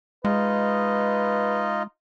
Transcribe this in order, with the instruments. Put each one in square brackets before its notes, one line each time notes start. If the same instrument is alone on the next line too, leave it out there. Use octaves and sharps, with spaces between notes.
[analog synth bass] G#3 [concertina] D#4 F4 D#5 [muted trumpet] B4